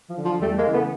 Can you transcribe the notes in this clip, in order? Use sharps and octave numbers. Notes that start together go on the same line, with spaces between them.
F3
D3
F3
E2 G3 A3
G#3 A#3
C#3 E3
A3 B3